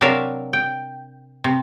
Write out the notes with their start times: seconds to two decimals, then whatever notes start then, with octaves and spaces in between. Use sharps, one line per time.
0.01 C3 F#3 D4 A#4 E5 F5
0.53 G5
1.44 C3